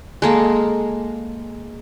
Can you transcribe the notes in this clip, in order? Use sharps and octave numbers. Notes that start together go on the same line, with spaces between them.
G#3 A#3 A4